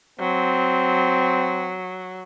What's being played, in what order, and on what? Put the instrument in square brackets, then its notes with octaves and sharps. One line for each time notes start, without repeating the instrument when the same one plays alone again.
[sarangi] F#3 [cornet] C4